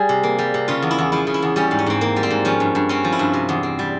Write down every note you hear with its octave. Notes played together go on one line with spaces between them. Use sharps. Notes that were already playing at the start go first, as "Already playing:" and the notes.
Already playing: G3 G#4
C3
A#3
G3
C3
C#3 F4
E2
E4
E2
F3 E4
C#3
E4
E2
G3 C#4
G#2
C#4
G#2 C4
A#3
G3
C4
G#2
F3 C#4
G2
G2
C4 C#4
F3
E4
G2
C3
E2
C4
G3